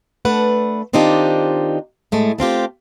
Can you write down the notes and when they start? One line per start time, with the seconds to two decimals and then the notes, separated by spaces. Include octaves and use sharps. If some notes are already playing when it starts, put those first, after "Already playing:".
0.25 A3 D4 B4 F#5
0.93 D#3 C4 D4 D#4 F4 G4
2.12 A2 G#3 A3
2.38 A3 C4 F4 G4